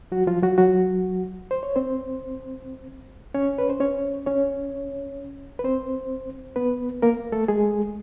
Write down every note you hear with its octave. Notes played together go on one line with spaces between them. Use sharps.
F#3 F#4
F3 F4
F#3 F#4
F#3 F#4
C5
C#5
C4 C5
C#4 C#5
B4
C5
C#4 C#5
C#4 C#5
B4
C4 C5
B3 B4
A#3 A#4
A3 A4
G#3 G#4